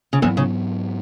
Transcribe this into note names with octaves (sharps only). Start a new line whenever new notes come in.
C#3
E2 G#2 E3 F#3 B3
C#3